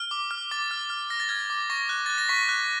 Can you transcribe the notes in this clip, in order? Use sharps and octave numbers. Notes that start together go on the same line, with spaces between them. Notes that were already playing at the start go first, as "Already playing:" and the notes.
Already playing: F6
D6
F6
D6 A6
F6
F6
F6 A#6
A6
F6 G#6
A6
D6
C#6 A#6
F#6
F#6 A6
A#6
C#6 B6
F#6